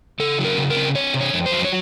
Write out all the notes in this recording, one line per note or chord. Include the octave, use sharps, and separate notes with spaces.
C#3 A4
F#3
A#4
C#3
A#4
C4
C4 C#5
C3
C#5
F2
C5
F#3
C#5